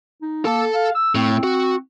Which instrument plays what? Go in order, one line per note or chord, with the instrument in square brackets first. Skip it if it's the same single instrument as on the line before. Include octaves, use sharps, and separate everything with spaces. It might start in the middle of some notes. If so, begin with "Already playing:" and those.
[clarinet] D#4
[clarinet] A#3 [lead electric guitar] A4 A5
[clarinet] F5
E6
[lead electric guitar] A2 [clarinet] C4
[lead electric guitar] F#4